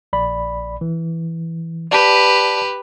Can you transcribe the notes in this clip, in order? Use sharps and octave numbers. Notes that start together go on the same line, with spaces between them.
A#1 D5 B5
E3
G4 B4 D5 A5 B6